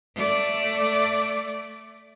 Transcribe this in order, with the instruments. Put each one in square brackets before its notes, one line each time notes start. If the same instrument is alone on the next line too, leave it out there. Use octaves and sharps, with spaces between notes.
[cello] A3 D5